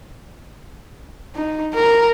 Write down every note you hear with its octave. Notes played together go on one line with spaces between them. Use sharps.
D#4
A#4